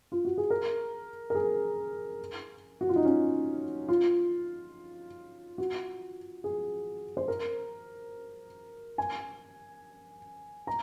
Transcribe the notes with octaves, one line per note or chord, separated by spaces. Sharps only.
F4
F#4
G#4
A#4
A#4
G#4
F#4
F4
D#4
C#4
F4
F#4
G#4
C5
A#4
G#5
A#5